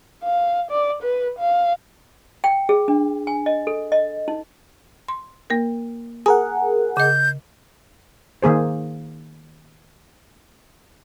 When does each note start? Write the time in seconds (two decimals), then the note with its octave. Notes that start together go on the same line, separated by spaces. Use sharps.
0.24 F5
0.71 D5
1.02 B4
1.39 F5
2.44 G5
2.69 G#4
2.88 D4
3.27 G#5
3.46 D#5
3.67 A4
3.92 D#5
4.28 D#4
5.08 C6
5.50 A#3 A#4
6.26 G#4 A#4 F#5 D#6
6.97 C#3 D#5 G6
8.42 D#3 A#3 G#4 C5